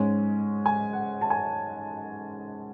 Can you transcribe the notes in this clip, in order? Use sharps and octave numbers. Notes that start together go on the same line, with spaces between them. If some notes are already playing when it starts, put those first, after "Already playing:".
Already playing: G#2 G#3 C#4 G#5
G#5
F#5
A5
G#5